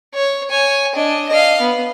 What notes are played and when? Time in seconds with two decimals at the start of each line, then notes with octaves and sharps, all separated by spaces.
0.15 C#5
0.50 C#5 G#5
0.95 D4 D#5
1.29 D#5 F5
1.61 B3